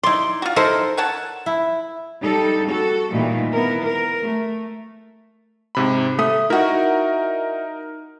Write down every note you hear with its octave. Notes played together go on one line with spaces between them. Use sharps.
D#4 E4 D5 C6
F4 F#4
D#4 E4 A4 A#4 C5
C#5 F#5 A5
E4
G3 D#4 A4
F#4 A4
A#2 D#3 E3 G3 A3 A#3
B3 E4 A#4
A#4
A3
G#2 C3 B5
A3 D#6
D#4 E4 F#4 A#4